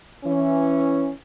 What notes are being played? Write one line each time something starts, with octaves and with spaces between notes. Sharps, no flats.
E3 C#4